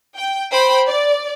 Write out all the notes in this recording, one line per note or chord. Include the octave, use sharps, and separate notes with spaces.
G5
C5 G5 B5
D5